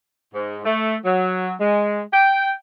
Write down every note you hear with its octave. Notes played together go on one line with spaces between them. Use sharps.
G#2
A3
F#3
G#3
G5